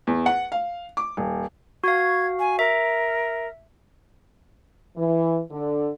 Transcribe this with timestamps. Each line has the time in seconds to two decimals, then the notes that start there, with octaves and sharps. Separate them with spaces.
0.07 E2
0.26 F#5
0.52 F5
0.97 D6
1.17 D#1
1.84 F#4 F5 G#6
2.39 G#5
2.59 A#4 E5
4.97 E3
5.51 D3